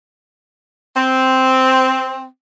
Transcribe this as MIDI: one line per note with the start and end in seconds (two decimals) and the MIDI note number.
0.97 2.25 60